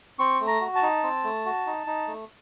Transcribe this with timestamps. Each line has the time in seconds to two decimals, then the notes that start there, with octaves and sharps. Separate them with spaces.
0.19 C4 C#6
0.41 A3
0.47 A#5
0.61 F#4
0.76 A5
0.82 D#4
1.03 C4
1.24 A3
1.46 F#4
1.66 D#4
1.87 D#4
2.07 A3